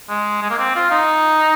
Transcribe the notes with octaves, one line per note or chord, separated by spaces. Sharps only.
G#3
G#3
A#3
C4
F4
D#4